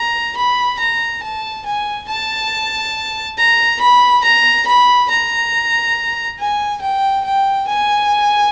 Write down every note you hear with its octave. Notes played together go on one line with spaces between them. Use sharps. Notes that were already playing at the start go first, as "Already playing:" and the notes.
Already playing: A#5
B5
A#5
A5
G#5
A5
A#5
B5
A#5
B5
A#5
G#5
G5
G5
G#5